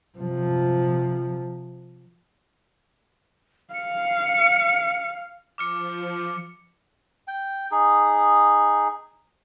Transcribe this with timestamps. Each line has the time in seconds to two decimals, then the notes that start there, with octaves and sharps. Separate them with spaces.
0.18 C3 F3
3.74 F5 C#7
5.58 F3 D6 F6 C#7
7.28 G5
7.71 D#4 G#4